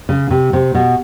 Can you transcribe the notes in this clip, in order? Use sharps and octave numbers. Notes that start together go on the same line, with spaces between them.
C#3
C3
C3
B2